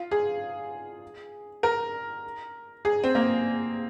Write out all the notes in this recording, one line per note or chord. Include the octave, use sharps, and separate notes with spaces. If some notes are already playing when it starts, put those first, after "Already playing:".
Already playing: F4
G#4
A#4
G#4
C4
A#3